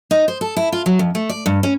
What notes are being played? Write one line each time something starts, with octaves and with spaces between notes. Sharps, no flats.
D#4
C5
A4
E4
F4
F#3
F2
A3
D5
G2
C#4